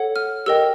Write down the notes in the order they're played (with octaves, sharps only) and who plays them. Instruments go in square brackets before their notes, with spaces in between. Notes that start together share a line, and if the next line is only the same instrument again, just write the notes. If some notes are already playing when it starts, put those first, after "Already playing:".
Already playing: [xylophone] A4 C#5 F#5
F6
G4 A#4 D#5 G5 E6